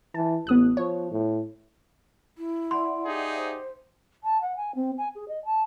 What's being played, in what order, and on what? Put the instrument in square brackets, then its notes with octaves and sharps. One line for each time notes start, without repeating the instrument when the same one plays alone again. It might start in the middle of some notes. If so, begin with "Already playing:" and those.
[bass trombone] E3 [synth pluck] A5
[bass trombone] A1 [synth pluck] B3 D#6 F#6
[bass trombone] F3 [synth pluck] C#5
[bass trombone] A2
[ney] E4
[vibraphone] D5 E5 F#5 [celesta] C6
[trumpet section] D#4 G4 G#4
[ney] C5
[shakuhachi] A5
F#5
G#5
C4
G#5
G#4
D#5
A5